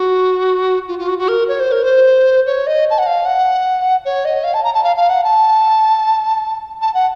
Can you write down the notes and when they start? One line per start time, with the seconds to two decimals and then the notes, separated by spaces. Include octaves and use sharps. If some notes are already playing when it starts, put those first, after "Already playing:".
Already playing: F#4
0.88 F4
0.99 F4
1.08 F#4
1.18 F#4
1.28 A#4
1.48 C#5
1.60 C5
1.72 A#4
1.83 C5
2.46 C#5
2.67 D#5
2.90 A5
2.98 F#5
3.06 F5
3.25 F#5
4.05 C#5
4.25 D#5
4.44 F5
4.54 A5
4.64 A#5
4.74 A5
4.83 F5
4.96 F5
5.09 F#5
5.24 A5
6.81 A5
6.94 F#5